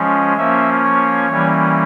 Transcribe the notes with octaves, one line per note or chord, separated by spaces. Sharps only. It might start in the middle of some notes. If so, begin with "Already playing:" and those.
Already playing: F3 G#3 C#4
F3 A#3 C#4 E5
C#5
E3 G3 A#3 C#4